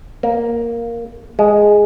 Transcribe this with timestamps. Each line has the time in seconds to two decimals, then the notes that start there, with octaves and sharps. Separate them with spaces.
0.23 A#3
1.39 G#3